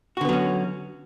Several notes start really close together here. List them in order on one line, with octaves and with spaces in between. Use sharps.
F#4 D3 B3 F#3 C#4